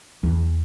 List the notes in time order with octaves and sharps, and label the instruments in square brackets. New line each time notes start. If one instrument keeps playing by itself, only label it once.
[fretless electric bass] E2